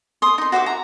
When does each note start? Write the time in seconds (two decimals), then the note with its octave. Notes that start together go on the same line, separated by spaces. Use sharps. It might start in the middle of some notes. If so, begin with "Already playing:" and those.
0.22 C6 D#6
0.38 D#4 C6
0.52 F#4 C5 E5 D6
0.66 A#5